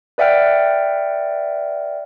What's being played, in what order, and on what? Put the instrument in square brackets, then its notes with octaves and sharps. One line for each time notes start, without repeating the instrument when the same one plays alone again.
[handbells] B4 D5 E5 F#5 G5 F6